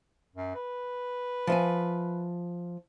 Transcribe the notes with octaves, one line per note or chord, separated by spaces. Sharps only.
F#2
B4
F3 E5 G#5